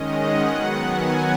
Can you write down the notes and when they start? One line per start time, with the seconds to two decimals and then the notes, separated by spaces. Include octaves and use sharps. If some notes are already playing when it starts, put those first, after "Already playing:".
Already playing: D#3 G#3 C#4 D#5
0.11 F#5
0.47 D#3 F#3 B3
0.83 G#5